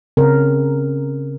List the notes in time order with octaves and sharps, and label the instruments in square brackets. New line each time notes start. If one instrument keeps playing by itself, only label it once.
[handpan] C#3 C4 A#4